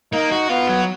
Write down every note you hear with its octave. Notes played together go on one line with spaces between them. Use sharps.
A#3 D#4
F#4
B3 F4
F#3